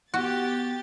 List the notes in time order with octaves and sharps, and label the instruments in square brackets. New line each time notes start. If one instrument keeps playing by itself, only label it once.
[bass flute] B3 [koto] F#4 [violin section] G4 A6